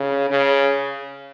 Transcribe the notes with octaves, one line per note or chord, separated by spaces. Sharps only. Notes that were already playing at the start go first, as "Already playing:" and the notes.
Already playing: C#3
C#3